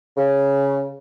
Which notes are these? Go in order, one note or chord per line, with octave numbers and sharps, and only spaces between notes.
C#3